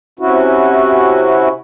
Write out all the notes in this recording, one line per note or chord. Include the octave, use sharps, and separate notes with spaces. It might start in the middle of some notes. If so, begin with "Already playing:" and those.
C3 C#4 E4 F#4